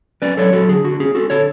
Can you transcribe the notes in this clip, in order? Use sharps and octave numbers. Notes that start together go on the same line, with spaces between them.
C#4 B4 D5
F#3 A4 C#5
F#3 F#4 A4
D3 G#4
D3 F#4
C#4 G#4
C#4 F#4 A4
D3 A4 C#5